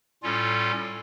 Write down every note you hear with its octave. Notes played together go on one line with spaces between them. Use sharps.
A2 G3 C#4 F4 A4